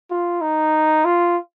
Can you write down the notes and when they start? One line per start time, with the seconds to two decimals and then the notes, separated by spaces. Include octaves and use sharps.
0.11 F4
0.41 D#4
1.05 F4